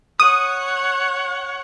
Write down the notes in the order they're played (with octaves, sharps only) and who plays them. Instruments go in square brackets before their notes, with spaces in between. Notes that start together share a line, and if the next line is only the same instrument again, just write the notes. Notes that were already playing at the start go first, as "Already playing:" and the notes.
[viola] C#5 F#5 [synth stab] D#6